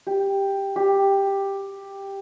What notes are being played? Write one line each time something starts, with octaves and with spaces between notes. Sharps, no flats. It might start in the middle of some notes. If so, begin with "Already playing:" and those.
G4
G4